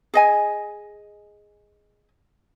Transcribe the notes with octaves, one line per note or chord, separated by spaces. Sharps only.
G#4 D#5 G#5